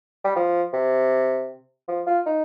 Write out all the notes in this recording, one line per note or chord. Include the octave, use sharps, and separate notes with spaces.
G3
F3
C3
F3
F4
D#4